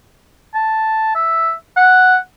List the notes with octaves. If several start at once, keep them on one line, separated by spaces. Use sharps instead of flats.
A5
E5
F#5